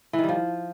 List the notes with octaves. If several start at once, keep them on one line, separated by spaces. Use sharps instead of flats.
E3
D#3
G3
F3